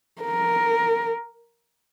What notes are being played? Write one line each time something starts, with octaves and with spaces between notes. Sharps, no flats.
A#4